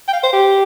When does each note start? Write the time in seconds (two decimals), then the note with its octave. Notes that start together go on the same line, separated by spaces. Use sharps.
0.08 G5
0.13 F5
0.23 C5
0.33 G4